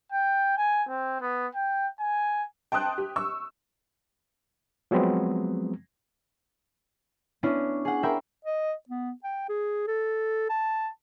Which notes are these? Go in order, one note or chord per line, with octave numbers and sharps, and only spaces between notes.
G5
G#5
C4
B3
G5
G#5
G5 A5 C6 D#6 F#6
G4
C#6 E6
F3 F#3 G#3 B3 C4
B3 C#4 D4 E4
G#4 F#5
A#4 E5 G5 B5 C6
D#5
B3
G5
G#4
A4
A5